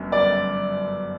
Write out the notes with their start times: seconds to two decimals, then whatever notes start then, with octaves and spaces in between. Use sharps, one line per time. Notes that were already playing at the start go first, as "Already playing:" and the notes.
Already playing: G1 F#2
0.12 D5